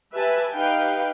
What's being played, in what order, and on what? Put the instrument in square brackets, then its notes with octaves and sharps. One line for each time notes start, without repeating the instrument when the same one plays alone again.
[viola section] G4 B4 E5 G#5 A5
D#4 G4 B4 F5 G5